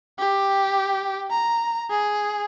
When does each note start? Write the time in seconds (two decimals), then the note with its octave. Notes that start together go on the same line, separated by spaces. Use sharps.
0.19 G4
1.31 A#5
1.90 G#4